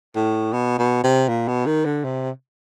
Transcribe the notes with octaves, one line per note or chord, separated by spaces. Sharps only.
A2
B2
B2
C3
A#2
B2
D#3
D3
C3